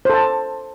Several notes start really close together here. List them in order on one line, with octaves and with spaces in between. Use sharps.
C5 A4 A5